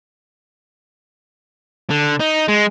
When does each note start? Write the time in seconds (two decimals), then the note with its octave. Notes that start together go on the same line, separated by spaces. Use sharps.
1.91 D3
2.20 D#4
2.49 G#3